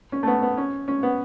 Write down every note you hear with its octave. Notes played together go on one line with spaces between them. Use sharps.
C#4
A3
B3
B3
C#4
C#4
B3